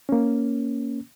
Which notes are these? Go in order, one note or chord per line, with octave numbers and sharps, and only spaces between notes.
A#3 C#4